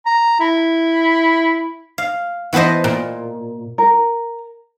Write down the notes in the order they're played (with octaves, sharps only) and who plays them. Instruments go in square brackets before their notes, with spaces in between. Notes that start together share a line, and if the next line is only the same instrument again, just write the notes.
[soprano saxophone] A#5
E4
[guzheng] F5
E3 B3 A4 C5 D#5
A#2
[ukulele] A#4